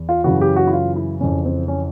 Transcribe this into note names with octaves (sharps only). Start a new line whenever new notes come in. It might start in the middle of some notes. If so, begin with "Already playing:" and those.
Already playing: E2
F4
F#2 C#3 E3 F#4
G4
F#4
E4
F4
E4
F2 C#3 E3 C#4
C4
C#4